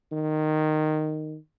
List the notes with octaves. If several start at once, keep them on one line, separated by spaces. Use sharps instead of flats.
D#3